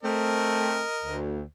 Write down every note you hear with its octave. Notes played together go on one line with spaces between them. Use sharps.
A3 C4 A#4 D#5
D2